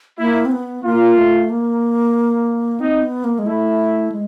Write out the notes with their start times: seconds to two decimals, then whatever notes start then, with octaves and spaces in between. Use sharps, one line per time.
0.19 A#3 E4
0.45 C4
0.52 B3
0.84 A#3 F4
1.17 A3
1.50 A#3
2.80 C4 D#4
3.02 B3
3.24 A#3
3.39 G#3
3.46 A3 E4
4.12 G#3